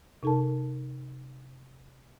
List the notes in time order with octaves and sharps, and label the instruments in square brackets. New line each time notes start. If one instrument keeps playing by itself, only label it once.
[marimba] C3 D#4 A4 A#4 A5